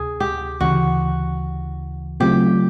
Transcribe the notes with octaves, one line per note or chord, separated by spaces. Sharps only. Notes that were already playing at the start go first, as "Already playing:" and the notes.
Already playing: D2 C3 G#4
G4
D2 C#3 E3 F#4
C#3 F#3 A3 C4 F4 G4